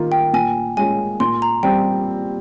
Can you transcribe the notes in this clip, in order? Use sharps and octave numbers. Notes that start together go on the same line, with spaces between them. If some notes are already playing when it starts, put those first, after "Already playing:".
Already playing: D#3 A#3 F4
G5
A#2 G#5
G#3 C#4 F4 G#5
A#2 C6
A#5
G3 C4 G5